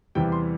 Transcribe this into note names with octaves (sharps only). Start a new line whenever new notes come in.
E2 C3 E3 G3 G5
C6